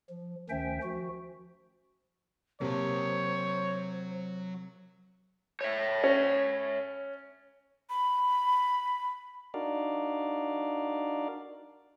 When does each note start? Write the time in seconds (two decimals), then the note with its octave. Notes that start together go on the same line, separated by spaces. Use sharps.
0.10 F3
0.49 D2 D#3 C#4 C5 E5 G5
0.83 F3 F#4
2.61 C3 F#3 A#3 C5 C#5 A5
5.61 C#5 E5
6.04 C#4
7.90 B5
9.54 D4 D#4 F#4 A#4 D5 F5